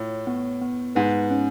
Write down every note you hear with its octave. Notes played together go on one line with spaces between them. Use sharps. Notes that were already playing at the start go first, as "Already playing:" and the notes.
Already playing: A2 F4 C#5
B3
B3
G#2 B4
C#4